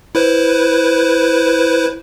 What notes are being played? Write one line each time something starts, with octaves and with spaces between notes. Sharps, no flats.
E4 B4 C5